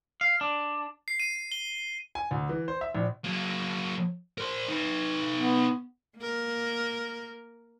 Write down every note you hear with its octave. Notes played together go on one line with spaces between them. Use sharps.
F5
D4
C7
D#7
G7
G#5
D2
E3
C5
E5
A#1
F#3 A#3
A#4 C5
D#4 B4
B3
A#3 A#4